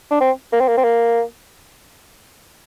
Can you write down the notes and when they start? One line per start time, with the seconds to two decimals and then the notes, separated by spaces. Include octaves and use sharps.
0.11 D4
0.21 C4
0.52 A#3
0.60 C4
0.68 A#3
0.77 C4
0.84 A#3